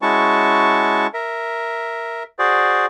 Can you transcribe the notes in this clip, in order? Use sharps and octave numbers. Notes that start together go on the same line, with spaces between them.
G#3 C#4 E4 F#4 A5 C#6
A#4 E5
F#4 G#4 C5 D5